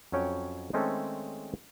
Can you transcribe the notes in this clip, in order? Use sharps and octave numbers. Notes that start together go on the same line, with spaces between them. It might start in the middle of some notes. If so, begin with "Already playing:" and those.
F2 F#3 C#4 C#5 G5
D#3 G#3 A3 C4 C#4 A4